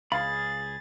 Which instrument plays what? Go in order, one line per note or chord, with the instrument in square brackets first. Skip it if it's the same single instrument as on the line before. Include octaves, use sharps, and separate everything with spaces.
[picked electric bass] C#2 [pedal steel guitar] G#4 B5 [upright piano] F5 [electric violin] A6